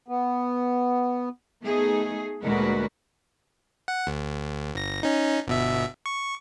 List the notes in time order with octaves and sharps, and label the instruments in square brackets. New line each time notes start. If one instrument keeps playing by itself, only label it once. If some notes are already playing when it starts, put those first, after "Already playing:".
[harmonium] B3
[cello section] A3 B3 D#4 G#4
D2 A#2 G#3 F#4 A#4 B4
[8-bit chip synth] F#5
D2
G1 A#6
C#4 D#4
G1 B2 E5
C#6